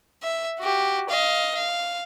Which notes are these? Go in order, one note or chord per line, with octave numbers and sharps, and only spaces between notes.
E5
F#4 G4
D#5 F5
F5